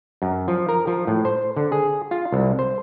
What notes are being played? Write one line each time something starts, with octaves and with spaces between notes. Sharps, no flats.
F#2
F3
A#4
F3
A2
C5
D3
G#4
F4
C2
C5